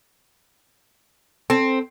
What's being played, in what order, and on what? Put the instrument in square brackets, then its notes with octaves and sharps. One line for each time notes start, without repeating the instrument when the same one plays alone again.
[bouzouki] C4 [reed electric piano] A4